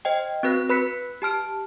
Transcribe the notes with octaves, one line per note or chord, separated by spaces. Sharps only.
C5 D#5 G5
C4 F#4 B4 F#6 A#6
B4 B5 F#6 B6 C#7
G4 A5 F6 D7